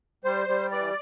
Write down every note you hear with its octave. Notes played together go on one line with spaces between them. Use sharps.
G3 C5
G3
E3 D5